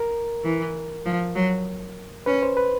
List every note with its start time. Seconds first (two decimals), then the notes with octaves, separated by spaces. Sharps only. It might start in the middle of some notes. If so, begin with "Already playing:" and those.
Already playing: A#4
0.44 E3
1.06 F3
1.36 F#3
2.26 C#4 B4
2.43 C5
2.57 B4